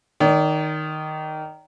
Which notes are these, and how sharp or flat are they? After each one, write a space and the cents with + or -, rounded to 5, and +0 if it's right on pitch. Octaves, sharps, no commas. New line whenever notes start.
D#3 -5 D5 -40